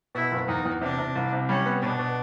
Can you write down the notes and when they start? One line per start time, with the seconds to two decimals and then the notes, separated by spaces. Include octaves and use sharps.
0.15 B2 E4
0.32 F#1
0.48 E2 D#4
0.65 E2
0.81 C3 D4
0.98 C3
1.15 C2
1.33 C3
1.48 G3 C#4
1.66 B3
1.82 B2 D4
1.99 B2